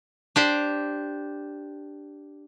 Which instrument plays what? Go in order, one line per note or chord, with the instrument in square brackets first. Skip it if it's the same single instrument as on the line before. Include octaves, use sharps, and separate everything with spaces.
[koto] D4 G4 C5